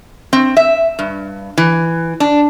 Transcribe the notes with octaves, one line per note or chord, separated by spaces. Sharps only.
C4
E5
G2
E3
D4